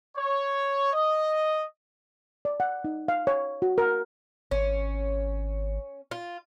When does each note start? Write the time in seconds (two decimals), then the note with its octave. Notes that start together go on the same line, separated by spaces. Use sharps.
0.17 C#5
0.92 D#5
2.45 D5
2.60 F#5
2.84 D#4
3.08 F5
3.27 C#5
3.62 F#4
3.78 A#4
4.51 G#1 C#4
6.11 F4